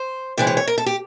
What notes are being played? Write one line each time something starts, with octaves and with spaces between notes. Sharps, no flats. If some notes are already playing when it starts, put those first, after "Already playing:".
Already playing: C5
C3 E3 G#3 D5
C#5
C#5
A#4
A4
G4